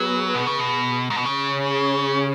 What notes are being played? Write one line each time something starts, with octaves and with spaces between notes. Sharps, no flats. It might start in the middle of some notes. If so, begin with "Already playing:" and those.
Already playing: F#3 B3 G#4 B4
B2
C#3
B2
G#2
B2
C#3 C#4 G#4 C#5